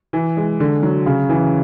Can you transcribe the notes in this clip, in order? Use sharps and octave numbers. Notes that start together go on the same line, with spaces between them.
E3
G#3
D3
F#3
C#3
E3